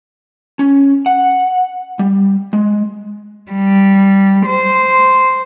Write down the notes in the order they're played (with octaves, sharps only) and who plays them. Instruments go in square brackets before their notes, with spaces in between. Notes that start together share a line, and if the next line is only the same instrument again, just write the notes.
[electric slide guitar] C#4
F#5
G3
G#3
[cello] G3
C5